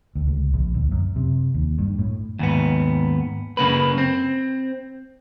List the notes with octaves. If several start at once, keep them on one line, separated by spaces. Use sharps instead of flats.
D2
C#2
A#1
D2
F#2
C3
D#2
G2
A2
D#2 G#2 B3
F#2 C#3 A#3 B4
C4